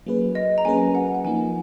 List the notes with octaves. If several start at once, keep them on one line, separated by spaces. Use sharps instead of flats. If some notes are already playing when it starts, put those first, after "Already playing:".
F#3 A#3 C#4 G#4 B4
D#5
A#5
F#3 A#3 C#4 G#4 B4 G#5
F#5
F#5
F3 A#3 D#4 G#5